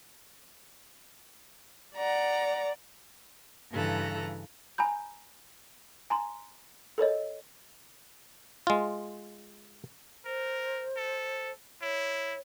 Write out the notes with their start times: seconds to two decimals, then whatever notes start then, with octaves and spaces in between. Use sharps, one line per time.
1.97 D5 F#5 A#5
3.71 G2 C#3 E3 A4 A#5 F#6
4.78 G#5 A#5 B5 G6
6.10 G#5 A#5 C6
6.98 A4 A#4 C#5 D#5
8.67 G#3 F4
10.25 A#4 C5
10.97 A4
11.82 E4 C#5